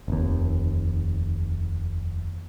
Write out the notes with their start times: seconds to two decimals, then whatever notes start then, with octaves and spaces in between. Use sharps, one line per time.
0.08 F1 D#2